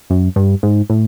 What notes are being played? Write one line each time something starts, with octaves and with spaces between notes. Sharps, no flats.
F#2
G2
G#2
A2